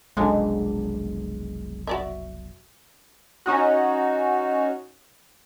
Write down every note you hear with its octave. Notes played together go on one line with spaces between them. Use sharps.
F1 B1 D3 F#3 G#3 C#4 D4
F#4 D5 E5
C#4 D#4 F#4